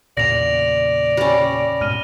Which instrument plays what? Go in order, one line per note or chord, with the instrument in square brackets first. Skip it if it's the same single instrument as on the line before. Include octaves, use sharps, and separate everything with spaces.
[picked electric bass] E2 A#2 C#3 [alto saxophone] D5 [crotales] A#6 F7
[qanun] G3 C#4
[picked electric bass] G#2 B2 [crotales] F6 D#7